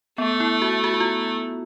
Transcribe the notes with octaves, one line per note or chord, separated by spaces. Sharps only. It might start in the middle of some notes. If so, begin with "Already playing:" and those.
A3 B3
E4
F#4
F#4
F#4
F4